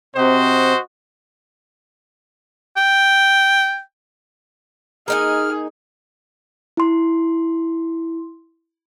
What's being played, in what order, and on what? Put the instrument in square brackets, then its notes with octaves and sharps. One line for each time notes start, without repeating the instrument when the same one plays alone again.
[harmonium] C3 [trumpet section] F#4 C5 D#5
[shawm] G5
[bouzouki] A#3 D#4 G#5 [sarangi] G#4 [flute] F6
[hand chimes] E4 C6